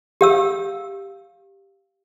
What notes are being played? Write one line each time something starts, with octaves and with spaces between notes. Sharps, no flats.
G4 F5 E6